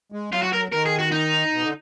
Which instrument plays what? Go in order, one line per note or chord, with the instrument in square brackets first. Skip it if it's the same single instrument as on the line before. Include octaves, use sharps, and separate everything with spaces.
[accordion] G#3
[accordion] F#3 [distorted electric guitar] F4
[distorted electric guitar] F#4
A#4
[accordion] D#3 [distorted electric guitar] A#4
[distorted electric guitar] G#4
F#4
D#4
[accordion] B2
D3